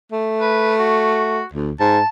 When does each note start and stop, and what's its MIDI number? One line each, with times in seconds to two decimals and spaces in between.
0.12 1.40 57
0.40 0.74 71
0.79 1.45 66
1.53 1.72 38
1.80 2.00 44
1.80 2.08 81